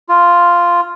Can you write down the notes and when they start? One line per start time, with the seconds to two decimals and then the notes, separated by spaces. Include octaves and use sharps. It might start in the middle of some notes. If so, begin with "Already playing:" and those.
0.09 F4